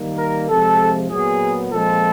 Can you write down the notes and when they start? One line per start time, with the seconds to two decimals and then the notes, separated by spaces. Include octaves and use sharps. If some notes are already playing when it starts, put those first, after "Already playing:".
Already playing: D#3 G3 A#3
0.18 A#4
0.48 C3 F3 G#3 A4
1.10 A#2 F#3 B3 G#4
1.71 A#2 F3 G#3 C4 A4